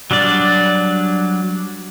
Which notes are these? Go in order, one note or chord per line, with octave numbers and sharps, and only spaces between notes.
F#3 G3 D4 D5